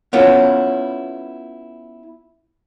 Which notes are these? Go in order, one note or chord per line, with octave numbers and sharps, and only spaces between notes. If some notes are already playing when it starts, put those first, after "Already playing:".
B3 C#4 E4 F4 A4